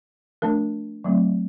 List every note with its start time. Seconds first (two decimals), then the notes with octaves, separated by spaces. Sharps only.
0.42 F3 A3 D4 A#4
1.04 F#3 A3 C4